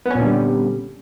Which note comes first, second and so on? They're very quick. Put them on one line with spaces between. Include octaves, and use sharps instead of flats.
B3 C#4 A#2 D3 G3